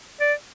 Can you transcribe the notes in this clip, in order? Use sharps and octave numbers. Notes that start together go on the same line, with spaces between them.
D5